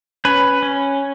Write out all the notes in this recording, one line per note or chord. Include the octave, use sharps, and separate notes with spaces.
C#4 B4
C#4